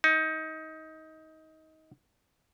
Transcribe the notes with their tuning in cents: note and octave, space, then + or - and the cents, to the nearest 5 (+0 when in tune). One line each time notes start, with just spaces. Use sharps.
D#4 +20